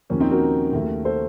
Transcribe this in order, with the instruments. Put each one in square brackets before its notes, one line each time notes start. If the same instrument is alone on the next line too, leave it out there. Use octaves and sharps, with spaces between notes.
[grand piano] D#2 C#3 F3 A#3 C#4
C4 D#4
F#4 A#4
D#2 C#3 A3
A4 C5